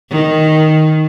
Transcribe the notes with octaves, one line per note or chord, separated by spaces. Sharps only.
D#3